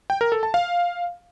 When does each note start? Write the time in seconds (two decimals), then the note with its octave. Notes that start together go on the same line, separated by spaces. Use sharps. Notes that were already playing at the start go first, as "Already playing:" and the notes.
0.10 G5
0.21 A#4
0.32 A4
0.43 A5
0.54 F5